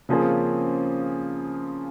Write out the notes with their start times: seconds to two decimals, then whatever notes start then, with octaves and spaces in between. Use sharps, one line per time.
0.09 C#3 F3 A#3 C#4 F4 G#4
0.19 C4
0.30 C#4